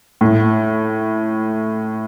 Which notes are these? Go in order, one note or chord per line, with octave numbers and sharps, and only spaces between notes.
A2